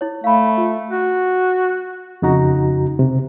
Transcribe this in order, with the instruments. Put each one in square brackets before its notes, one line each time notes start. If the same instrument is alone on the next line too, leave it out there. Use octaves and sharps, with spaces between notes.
[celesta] E4 C#5
[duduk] A3 [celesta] F5 B5
[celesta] F4
[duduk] F#4
[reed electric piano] F2 C#3 D#4 F#4 A#5
C3